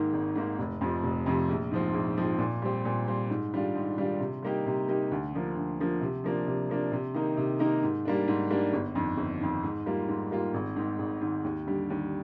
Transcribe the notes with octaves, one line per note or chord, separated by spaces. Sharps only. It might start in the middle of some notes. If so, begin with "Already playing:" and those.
Already playing: G#2 D#3 A#3
G#1
G#2 D#3 A#3
F1
F2 C3 F3
F1
F2 C3 F3
A#1
G#2 F3 C4
A#1
G#2 F3 C4
A#2
G3 C4
A#2
G3 C4
G#2
D#3 G3 D4 F4
G#2
D#3 G3 D4 F4
C3
G3 A#3 D#4 G4
C3
G3 A#3 D#4 G4
D2
D3 F3 A#3
D2
D3 F3 A#3
C3
F3 A#3 D4
C3
F3 A#3 D4
C3
D#3 A#3 D#4 A#4
C3
D#3 A#3 D#4 A#4
G#2
G3 A#3 D4
G#2
G3 A#3 D4
G1
F2 D#3
G1
F2 D#3
G#2
G3 A#3 F4
G#2
G3 A#3 F4
G#1
G#2 D#3
G#1
G#2 D#3
D#2
D3 G3
D#2